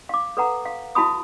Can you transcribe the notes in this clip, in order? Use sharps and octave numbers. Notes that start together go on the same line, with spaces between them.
F5 D6
A4 B4 F#5 A#5
F5
E4 F#4 A5 B5 D#6